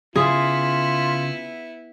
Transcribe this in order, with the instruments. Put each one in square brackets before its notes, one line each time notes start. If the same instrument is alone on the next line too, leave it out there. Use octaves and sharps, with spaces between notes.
[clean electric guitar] C#3 [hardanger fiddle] B3 E4 [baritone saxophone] F4 [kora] G#4